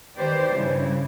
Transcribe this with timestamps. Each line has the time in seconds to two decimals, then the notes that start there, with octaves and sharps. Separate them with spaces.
0.16 D#3 G4 B4 C5 D5
0.53 G2 C#3 E4